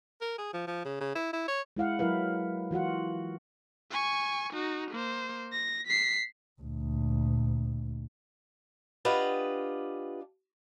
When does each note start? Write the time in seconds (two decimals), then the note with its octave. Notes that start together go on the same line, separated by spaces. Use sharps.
0.21 A#4
0.38 G#4
0.53 F3
0.67 F3
0.85 C#3
1.00 C#3
1.15 E4
1.33 E4
1.48 C#5
1.77 G#3 E4 F5 F#5
1.99 F#3 E4 A#4 B4 F5
2.71 E3 F4 F#4 F#5
3.92 G#5 C#6
4.53 D#4 F#4
4.91 A#3 C5
5.52 A#6
5.87 B6 C7
6.61 D2 A#2
9.05 D4 F4 G4 B4 D#5 F#5